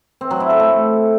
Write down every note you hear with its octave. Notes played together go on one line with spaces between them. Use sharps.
C4
F#3
E4
A4
A3